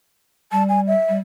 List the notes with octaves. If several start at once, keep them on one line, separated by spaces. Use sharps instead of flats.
G3 A5
G#5
E5
G3